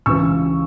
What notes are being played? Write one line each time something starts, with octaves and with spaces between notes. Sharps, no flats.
C#2 C#3 E3 C#6 E6